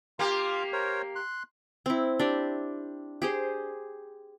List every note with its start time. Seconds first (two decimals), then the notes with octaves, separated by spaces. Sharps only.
0.19 A#3 F4 G4 F5
0.73 A#4 C5 C#5
1.15 C6 F#6
1.86 C4 E4
2.20 D4 G4
3.22 G4 G#4 C5